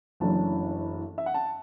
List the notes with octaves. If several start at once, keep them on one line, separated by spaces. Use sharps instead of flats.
F#1 F#2 E3 A3 D4 A5
E5
F#5
A5